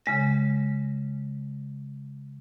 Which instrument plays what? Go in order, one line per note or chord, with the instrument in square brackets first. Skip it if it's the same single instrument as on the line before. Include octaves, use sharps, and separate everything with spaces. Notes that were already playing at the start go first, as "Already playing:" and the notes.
[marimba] C#3 G#3 A#6